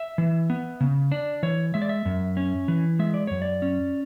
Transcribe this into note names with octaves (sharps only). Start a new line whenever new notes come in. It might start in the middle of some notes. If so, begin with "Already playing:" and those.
Already playing: E5
E3
B3
C#3
D4 D5
E3 C#5
G#3 E5
D5
E5
F#2
C#4
E3
G#3 E5
D5
F#2 C#5
D5
C#4